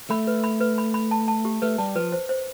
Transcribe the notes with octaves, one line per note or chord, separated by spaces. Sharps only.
A3 B5
B4
B5
B4
B5
B5
A5
A5
G4
A3 B4
G3 A5
F3 B4
C5
C5